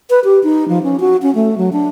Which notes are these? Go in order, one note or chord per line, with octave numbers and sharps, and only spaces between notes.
B4
G4
D#4
F3
C#4
F#4
C#4
A3
F#3
D4